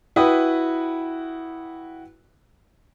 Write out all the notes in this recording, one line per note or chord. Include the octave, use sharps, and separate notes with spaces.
E4 F#4 B4 G5 D#6